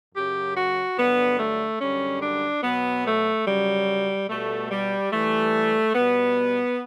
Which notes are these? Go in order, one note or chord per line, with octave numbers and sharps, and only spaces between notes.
F#2 C#3 F#3 G4
F#4
G2 D3 F#3 B3
A3
F#2 D3 G3 C#4
D4
B2 F#3 B3
A3
F#2 C#3 F#3 G3
B2 G3 A3
G3
G2 E3 G3 A3
B2 G3 B3